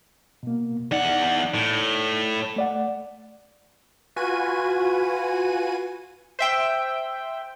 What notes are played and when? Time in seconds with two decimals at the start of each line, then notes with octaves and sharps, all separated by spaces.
0.43 B2 A#3
0.91 E2 D#4 D5 F#5
1.55 A2
2.56 A3 D5 F#5
4.16 F4 F#4 B4 G#5 D#7
6.39 C5 E5 G5